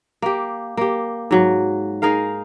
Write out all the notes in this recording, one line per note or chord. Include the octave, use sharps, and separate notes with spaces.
A#3 G4
A#3 G4
G#2 F#3
D#4 G#4 A#4 F5